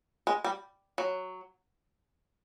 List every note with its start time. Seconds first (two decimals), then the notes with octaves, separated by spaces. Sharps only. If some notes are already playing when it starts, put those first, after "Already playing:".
0.27 G#3
0.44 G3
0.98 F#3